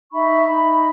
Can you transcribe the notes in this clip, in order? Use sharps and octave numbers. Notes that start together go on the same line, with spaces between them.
D#4 E5 B5 C#6
D#4 B5